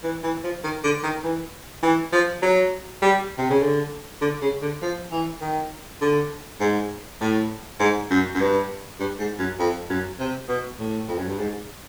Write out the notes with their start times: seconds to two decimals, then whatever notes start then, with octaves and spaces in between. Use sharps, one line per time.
0.04 E3
0.24 E3
0.44 F3
0.64 D#3
0.84 D3
1.03 D#3
1.24 E3
1.83 E3
2.13 F3
2.43 F#3
3.02 G3
3.38 C3
3.50 C#3
3.63 D3
4.21 D3
4.42 C#3
4.62 D3
4.82 F3
5.12 E3
5.41 D#3
6.01 D3
6.60 G#2
7.21 A2
7.80 G#2
8.11 F#2
8.35 F#2
8.40 G2
9.00 G2
9.19 G#2
9.39 F#2
9.59 F2
9.90 F#2
10.19 C3
10.49 B2
10.79 A2
11.08 F2
11.19 F#2
11.28 G2
11.39 G#2